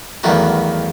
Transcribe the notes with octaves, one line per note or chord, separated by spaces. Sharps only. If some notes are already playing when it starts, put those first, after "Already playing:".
E2 G2 D#3 F#3 A3 D#4